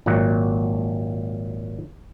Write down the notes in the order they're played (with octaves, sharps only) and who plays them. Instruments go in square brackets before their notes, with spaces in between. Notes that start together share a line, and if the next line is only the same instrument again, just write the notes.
[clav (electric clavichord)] G#1 A#2 F#3 F#5